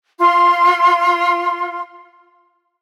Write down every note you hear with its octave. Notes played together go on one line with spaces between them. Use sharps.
F4 C6